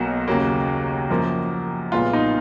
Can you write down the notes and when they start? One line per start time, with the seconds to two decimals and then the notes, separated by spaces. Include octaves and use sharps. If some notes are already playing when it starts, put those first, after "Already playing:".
Already playing: B1 B2 F#3 A#3 F#4
0.28 D#2 C#3 F#3 A#3
1.10 F#2 F3 A#3
1.92 B1 A#2 G#3 B3 F4
2.13 D#4